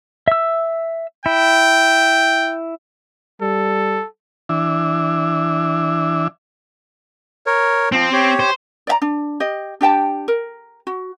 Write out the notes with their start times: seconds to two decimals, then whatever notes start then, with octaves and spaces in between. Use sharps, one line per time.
0.28 E5 E6
1.26 E4 G5
3.41 G3 A4
4.49 E3 D4 E5
7.46 A#4 C#5
7.92 F3 C4
8.13 G4 C#5
8.40 C5
8.87 D5 E5 A#5
9.02 D4
9.40 G4 D#5
9.81 D4 G4 G5 A5
10.28 A#4
10.87 F#4